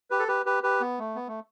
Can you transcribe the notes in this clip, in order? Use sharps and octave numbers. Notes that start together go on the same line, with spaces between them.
G4 B4
A4
G4 B4
G4 B4
G4 B4
B3
A3
B3
A3